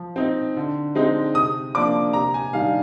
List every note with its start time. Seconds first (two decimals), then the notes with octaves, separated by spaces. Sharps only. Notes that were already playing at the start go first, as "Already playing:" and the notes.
Already playing: F3
0.16 C4 D#4
0.57 D3
0.95 G#3 C4 D#4
1.35 C3 D#6
1.75 F3 A#3 D4 D6
2.13 C3 A#5
2.34 G#5
2.53 D#3 G3 D4 F5